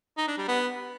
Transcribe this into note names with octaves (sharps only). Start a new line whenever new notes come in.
D#4
D4
G3
B3